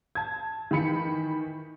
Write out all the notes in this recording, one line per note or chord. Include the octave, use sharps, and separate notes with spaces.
A5 G#6
D#3 E3 B5 C#7